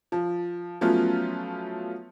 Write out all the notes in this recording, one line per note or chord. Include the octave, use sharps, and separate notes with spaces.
F3
F3 F#3 A3 B3 C#4 F4